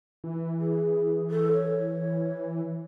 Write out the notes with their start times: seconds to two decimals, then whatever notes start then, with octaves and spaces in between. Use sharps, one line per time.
0.24 E3
0.59 G#4
1.30 A4
1.52 C#5